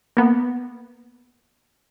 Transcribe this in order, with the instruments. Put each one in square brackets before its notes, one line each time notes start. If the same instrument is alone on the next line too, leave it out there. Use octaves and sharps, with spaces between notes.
[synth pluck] A#3 B3